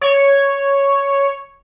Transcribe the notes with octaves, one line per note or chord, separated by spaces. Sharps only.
C#5